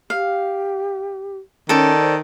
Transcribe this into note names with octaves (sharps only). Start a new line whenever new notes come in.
G4 F5
D#3 C#4 A4 D5
C5